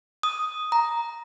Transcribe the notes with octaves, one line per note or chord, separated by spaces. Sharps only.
D#6
A#5